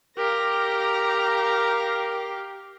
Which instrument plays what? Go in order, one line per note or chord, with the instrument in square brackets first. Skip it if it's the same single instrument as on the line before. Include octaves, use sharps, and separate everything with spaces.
[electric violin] G4 [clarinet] A#4 [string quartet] F5 A#5 A#6